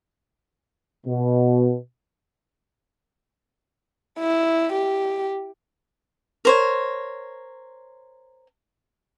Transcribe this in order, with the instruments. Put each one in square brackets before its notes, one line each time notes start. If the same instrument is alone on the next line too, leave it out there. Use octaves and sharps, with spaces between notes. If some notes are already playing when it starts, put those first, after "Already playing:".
[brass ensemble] B2
[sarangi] E4
G4
[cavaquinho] A#4 C5 C#5